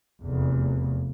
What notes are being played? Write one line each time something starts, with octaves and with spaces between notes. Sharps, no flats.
F1 E2